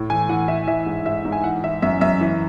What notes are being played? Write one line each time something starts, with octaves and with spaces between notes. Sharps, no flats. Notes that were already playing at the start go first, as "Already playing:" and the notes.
Already playing: A2
E3 G#5
E3 F#5
E3 E5
E3 E5
G#2
G#2 E5
G#2
G#5
E3 F#5
E3 E5
F#2 E5
F#2 E5
E3